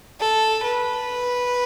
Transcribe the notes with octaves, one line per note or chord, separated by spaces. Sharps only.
A4
B4